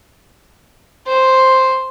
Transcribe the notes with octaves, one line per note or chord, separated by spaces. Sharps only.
C5